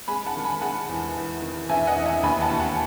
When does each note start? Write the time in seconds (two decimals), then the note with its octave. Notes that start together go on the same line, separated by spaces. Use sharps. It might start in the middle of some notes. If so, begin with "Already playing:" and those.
0.08 G#3 G#5 B5
0.26 F#5 A5
0.36 D#3
0.44 G#5 B5
0.61 G#3 F#5 A5
0.89 E2
1.16 E2
1.42 D#3
1.69 E2 E5 G#5
1.87 D#5 F#5
1.96 E2
2.05 E5 G#5
2.23 D#2 G#5 B5
2.41 F#5 A5
2.50 D#2
2.60 F#5 A5